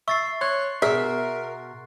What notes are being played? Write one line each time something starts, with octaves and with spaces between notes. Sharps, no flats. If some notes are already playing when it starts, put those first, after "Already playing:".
E5 C#6 A6 C7
C#5 C6 F#6
B2 G#4 A#4 E5